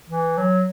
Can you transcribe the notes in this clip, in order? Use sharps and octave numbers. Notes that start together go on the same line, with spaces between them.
E3
F#3